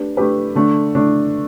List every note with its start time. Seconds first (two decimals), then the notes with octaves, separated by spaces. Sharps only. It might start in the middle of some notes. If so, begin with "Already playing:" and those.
Already playing: A3 D4 G4 B4
0.17 A3 D4 G4 B4
0.55 D3 A3 D4
0.95 D3 A3 D4